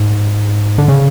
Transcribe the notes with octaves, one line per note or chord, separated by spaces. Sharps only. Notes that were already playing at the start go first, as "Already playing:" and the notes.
Already playing: G#2
D3
C#3